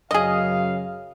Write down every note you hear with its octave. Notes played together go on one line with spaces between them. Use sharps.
F#2 C#3 G#4 D#5 F5